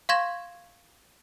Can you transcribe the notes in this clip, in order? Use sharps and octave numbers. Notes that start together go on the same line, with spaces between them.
F5 C6 C#6 G#6 A#6 E7